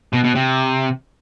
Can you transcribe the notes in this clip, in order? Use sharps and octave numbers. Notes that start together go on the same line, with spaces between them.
B2
B2
C3